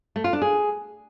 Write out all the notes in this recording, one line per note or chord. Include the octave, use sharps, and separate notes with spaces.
A3
F4
D4
G#4